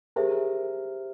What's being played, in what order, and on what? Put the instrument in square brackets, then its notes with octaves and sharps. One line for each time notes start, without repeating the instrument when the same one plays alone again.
[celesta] G4 C5 E5 [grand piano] G#4 A#4